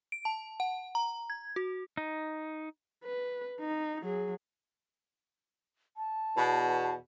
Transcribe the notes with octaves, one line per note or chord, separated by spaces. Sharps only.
D7
A5
F#5
A#5
G#6
F#4
D#4
B4
D#4
F#3 G#4
A5
E2 B2